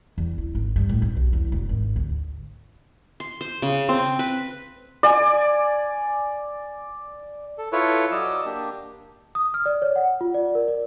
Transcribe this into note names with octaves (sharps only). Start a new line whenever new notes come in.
E2
E4
G#1
G2
A2
C4
B1
E2
E1
G#1
D2
C6
C5
C#3
C4
B4
D5 G#5
A4
E4 F4 A4 B4 C#5
F#3 D5 D#5 E6
A#3 D4 G4
D#6
F6
D5
C#5
F#5
F4
D5
A#4
D5